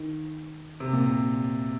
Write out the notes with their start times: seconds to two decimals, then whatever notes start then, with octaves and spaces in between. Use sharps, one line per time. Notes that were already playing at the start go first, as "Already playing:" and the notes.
Already playing: D#3
0.80 C3
0.93 A#2
1.06 C3